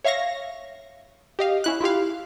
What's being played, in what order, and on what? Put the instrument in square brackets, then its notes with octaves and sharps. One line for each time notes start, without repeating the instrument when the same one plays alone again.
[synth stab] C#5 E5 F5 C#6 A#6
G4 D#5 F5
C#4 E4 F#6
E4 F4 G4 F5